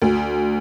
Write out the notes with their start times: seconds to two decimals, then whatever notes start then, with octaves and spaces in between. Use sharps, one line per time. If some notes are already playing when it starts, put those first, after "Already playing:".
0.02 D2